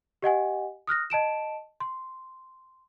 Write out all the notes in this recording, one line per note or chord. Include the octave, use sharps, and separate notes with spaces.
G4 D#5 F#5 G#5
D#6 F6 F#6 A#6
D#5 A5 D7 E7
C6